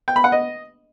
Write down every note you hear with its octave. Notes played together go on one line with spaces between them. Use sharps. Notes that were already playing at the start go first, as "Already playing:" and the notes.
G5
B5
F#5
D#5